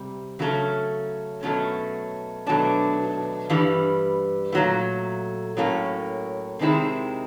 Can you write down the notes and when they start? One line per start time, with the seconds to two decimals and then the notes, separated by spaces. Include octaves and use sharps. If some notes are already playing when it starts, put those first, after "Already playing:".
Already playing: C3 G3
0.39 C#3 F#3 A3 C#4
1.43 B2 F#3 A3 C#4
2.47 B2 F#3 A3 D4
3.50 G2 E3 G3
4.52 A#2 F#3 A3
5.57 A2 F#3 A#3 C#4
6.59 C3 D#3 G#3 C4 E4